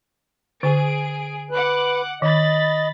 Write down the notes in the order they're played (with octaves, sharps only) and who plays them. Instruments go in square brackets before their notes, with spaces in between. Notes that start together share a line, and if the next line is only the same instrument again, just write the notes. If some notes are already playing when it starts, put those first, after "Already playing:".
[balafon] D3 [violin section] G#4 D7
[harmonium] B4 [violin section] F#5 D6 F#6
[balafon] D#3 [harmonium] D#5 [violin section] B5 A6